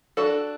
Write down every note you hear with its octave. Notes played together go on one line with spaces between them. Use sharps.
D4 F#4 A4